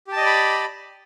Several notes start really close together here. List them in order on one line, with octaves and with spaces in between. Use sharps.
G4 A5 D#5 D5 B5